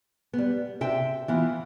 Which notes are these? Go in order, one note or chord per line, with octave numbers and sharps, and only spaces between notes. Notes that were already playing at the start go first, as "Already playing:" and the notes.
G3 B3
C3 E5 G5
E3 B3 F4